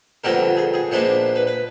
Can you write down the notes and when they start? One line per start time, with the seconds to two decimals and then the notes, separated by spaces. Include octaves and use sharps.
0.24 F2 D3 G3 B3 D4 A#4
0.57 G#4
0.74 G#4
0.91 A#2 F3 G#3 B3 D4
1.36 B4
1.47 B4